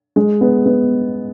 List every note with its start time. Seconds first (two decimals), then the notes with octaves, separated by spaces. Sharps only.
0.16 G#3
0.41 B3
0.66 B3